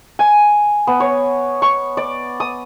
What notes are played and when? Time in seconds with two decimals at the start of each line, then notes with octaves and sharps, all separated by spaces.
0.19 G#5
0.87 B3
1.00 C#5
1.62 C#6
1.97 D5
2.40 D#6